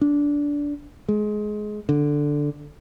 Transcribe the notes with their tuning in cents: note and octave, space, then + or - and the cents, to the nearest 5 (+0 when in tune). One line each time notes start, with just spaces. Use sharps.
D4 -15
G#3 +20
D3 +0